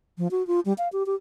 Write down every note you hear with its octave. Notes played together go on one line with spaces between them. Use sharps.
F3
F#4
F4
G3
F5
G4
G4